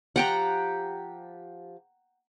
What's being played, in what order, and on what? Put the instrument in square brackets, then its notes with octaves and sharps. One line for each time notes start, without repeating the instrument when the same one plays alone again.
[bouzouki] F3 G4 [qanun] F#5 G5 A#5